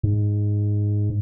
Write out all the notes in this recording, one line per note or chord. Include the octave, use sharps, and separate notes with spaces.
G#2